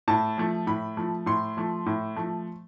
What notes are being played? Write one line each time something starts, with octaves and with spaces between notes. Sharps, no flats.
A2 A5
F3 A3
A2 B5
F3 A3
A2 C6
F3 A3
A2
F3 A3